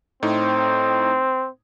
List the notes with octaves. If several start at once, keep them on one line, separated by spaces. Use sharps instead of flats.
A2 C4 D#4